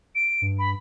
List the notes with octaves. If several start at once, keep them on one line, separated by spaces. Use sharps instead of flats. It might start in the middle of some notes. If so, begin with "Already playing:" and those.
D7
G2
B5